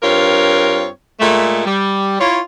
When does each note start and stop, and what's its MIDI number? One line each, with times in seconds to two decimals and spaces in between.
0.03 0.86 43
0.03 0.86 60
0.03 0.86 65
0.03 0.86 70
0.03 0.86 73
1.20 1.61 46
1.20 1.61 56
1.20 1.61 57
1.65 2.15 55
2.19 2.37 64
2.19 2.37 65
2.19 2.37 73